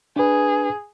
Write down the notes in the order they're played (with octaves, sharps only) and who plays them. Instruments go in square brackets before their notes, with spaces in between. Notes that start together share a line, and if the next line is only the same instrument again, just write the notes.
[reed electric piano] D4 B4 [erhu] G#4